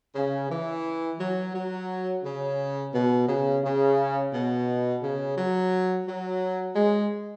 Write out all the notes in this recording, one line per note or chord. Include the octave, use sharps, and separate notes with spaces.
C#3
E3
F#3
F#3
C#3
B2
C#3
C#3
B2
C#3
F#3
F#3
G#3